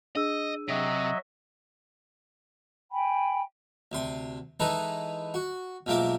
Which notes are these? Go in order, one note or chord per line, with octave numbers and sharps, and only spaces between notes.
D4 G#4 D#5 E6
C3 F#3 D#5 E5
G5 G#5 B5
D2 C3 C6
E3 G#3 D#4 A4 B4
F#4
B1 G#2 F3 A#3 E5 D6